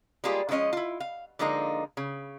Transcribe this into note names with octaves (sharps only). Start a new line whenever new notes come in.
G3 G#3 A#3 F4 G4 G#4
D3 F3 G#3 C#4 D#5
E4 F4
F5
D3 F3 G#3 A#3 D#4
C#3